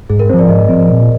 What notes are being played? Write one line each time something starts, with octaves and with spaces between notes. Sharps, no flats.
G#2 G#4
A#4
F3 C4 C5
D5
G#2 D#5
F3 C4
A#2